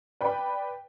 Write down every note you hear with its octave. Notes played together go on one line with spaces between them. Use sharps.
B4 D5 G5 B5